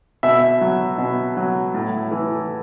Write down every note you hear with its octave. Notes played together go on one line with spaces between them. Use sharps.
B2 E5
F#3
B2
F#3
A2
E3